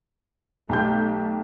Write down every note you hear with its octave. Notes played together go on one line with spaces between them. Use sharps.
B1 A3 G4 G6